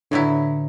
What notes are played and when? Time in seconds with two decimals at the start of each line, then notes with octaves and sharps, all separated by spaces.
0.11 A2 D3 F#3 B3 E4